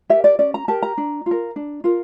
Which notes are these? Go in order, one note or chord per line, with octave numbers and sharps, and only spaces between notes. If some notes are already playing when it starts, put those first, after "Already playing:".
G4 A#4 E5
D5
C#4 D5
A#5
G4 A#4 A5
A#5
D4
F4
A#4
D4
F4 A#4